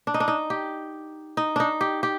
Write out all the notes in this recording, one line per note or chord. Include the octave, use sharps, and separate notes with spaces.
D4
D#4
D4
D#4
G4
D#4
D4 D#4
G4
G4